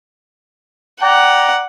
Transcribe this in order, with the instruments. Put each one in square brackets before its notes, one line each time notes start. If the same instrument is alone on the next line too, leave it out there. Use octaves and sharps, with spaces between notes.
[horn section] D5 G5 A#5 [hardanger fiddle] F#5